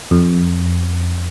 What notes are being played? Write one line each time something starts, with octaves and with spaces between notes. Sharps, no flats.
F2